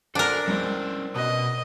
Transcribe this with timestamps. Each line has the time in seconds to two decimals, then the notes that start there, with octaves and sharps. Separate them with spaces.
0.15 D4 A4 A#4 C5 F#5 G#5 C6
0.47 C2 G#3 C#4 C5
1.16 B2 B4 D#5